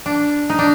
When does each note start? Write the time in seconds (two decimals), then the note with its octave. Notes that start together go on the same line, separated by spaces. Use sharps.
0.06 D4
0.50 D#4
0.59 D4